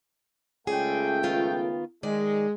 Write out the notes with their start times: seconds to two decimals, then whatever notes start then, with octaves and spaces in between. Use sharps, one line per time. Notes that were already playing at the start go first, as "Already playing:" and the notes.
0.67 C#2 A3 G#4 D5 G5
1.23 D#3 B3 F4
2.03 D#3 G#3 D5